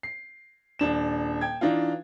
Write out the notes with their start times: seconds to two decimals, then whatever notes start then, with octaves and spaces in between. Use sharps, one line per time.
0.03 C7
0.79 D#1 D4 E7
1.41 G5 G#6
1.61 E3 D4 D#4 F4